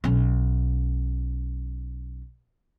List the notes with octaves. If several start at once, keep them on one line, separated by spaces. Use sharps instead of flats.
B1 C#4